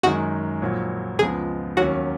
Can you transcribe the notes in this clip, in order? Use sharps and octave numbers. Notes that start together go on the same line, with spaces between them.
F#2 D#3 G#3 D#4 F#4
A#1 A#2 F#3
C#2 C#3 F3 G#3 B3 G#4
D#2 D#3 F#3 C#4 F#4